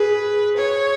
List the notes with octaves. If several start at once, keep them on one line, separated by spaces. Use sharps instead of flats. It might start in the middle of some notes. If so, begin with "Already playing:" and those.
Already playing: G#4 B4
C#5